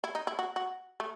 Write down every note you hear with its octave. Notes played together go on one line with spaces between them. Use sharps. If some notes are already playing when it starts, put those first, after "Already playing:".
E4
D#4
E4
F#4
F#4
A3